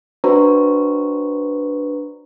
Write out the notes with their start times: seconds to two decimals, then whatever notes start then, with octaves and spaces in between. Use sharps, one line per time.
0.24 D4 F#4 B4 C5 A#5 C#6